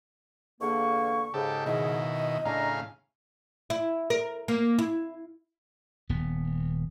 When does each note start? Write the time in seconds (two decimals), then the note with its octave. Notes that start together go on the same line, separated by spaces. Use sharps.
0.61 E2 D3 A#3 C#6
1.34 G#2 C#3 G4 A4
1.66 B2 D#3 E4 D#5
2.45 A2 C#3 D4 F5 A#5
3.70 E4
4.10 A#4
4.48 A#3
4.79 E4
6.09 D#1 B3